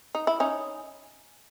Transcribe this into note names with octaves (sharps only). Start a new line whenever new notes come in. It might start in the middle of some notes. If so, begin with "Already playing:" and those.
D#4
E4
C#4 D#4